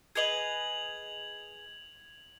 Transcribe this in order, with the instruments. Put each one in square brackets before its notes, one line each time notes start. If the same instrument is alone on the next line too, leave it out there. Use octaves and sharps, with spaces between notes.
[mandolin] G#4 B4 D#5 [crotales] G#6 F7 F#7